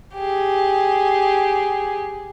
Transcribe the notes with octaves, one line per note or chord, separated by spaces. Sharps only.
G4 G#4